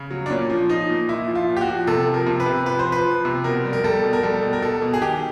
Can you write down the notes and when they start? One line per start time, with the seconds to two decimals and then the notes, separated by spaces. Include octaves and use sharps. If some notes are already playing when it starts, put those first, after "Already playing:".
Already playing: C#3
0.11 F#3
0.26 D4
0.30 A#2 C#4
0.50 F3
0.69 F3 D#4
0.89 A#2
1.09 A#2 E4
1.28 F3
1.35 F4
1.48 A#2
1.57 G4
1.61 F#4
1.68 F3
1.87 C3 A4
2.07 F3
2.14 A#4
2.26 C3
2.40 B4
2.46 C3
2.66 F3 B4
2.79 C5
2.86 F3
2.92 B4
3.05 F3
3.25 C3
3.44 B2 A#4
3.65 G3
3.73 A#4
3.84 G3 A4
4.04 B2
4.13 A#4
4.23 G3 A4
4.43 B2
4.53 A#4
4.62 B2 A4
4.82 B2
4.94 G#4
5.02 D#3 G4